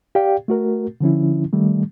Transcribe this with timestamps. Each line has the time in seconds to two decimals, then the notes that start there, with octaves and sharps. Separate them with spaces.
0.15 G4 D5 F5 G5
0.48 A3 F#4 A#4
1.01 D3 F3 C#4 E4
1.53 D#3 G3 A3